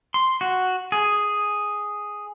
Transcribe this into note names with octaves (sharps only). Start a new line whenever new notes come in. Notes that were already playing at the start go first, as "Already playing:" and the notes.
C6
F#4
G#4